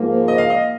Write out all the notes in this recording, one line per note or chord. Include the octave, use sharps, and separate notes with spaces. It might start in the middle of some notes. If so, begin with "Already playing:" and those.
Already playing: G#2 F3 A#3
D#5
F5
D#5